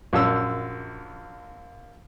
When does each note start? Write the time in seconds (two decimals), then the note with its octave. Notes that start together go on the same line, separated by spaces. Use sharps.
0.13 A#1 F#2 E6